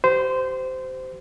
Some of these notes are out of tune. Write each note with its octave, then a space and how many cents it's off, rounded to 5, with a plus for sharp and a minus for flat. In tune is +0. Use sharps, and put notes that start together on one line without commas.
G4 -30 C5 -20